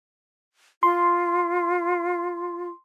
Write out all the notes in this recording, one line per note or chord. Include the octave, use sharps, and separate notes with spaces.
F4 C6